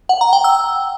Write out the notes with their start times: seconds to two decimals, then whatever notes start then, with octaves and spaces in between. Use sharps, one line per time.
0.09 F#5
0.21 A#5
0.33 G5
0.44 E6